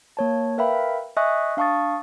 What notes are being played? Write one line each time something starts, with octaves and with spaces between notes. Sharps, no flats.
A#3 C#5 A5
A#4 B4 E5 F5 G5 B5
D#5 E5 G#5 C#6 D#6 F#6
D4 F5 A5 C#6 D#6 A6